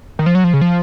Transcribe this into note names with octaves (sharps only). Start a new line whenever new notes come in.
D#3
F3
F#3
F3
C#3
F3